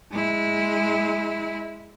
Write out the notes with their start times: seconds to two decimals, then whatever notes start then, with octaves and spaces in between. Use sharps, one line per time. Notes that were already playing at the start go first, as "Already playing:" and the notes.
0.11 G#3 E4